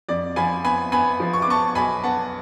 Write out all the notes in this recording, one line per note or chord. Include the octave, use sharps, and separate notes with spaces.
F2 D5
F3 G#5 B5
B3 G#5 B5
B3 G#5 B5
F3
C#6
D6
B3 A5 C#6
B1 G#5 B5
B3 F#5 A5